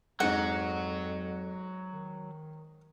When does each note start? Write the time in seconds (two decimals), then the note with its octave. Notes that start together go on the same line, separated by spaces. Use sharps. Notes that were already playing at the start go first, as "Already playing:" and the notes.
0.20 F2 G#2 F#3 G#3 F#5
1.93 D#3